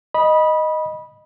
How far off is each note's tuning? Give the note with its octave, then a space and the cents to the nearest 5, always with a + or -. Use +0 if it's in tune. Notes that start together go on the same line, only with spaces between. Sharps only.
D#5 +0 B5 -20